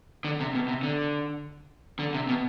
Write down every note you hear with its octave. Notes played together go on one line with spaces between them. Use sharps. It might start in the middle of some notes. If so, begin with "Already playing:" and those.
D3
C3
B2
C3
D3
D3
C3
B2